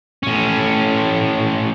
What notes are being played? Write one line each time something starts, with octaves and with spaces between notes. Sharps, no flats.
A2 C#4